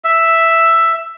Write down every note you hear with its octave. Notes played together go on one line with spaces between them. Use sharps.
E5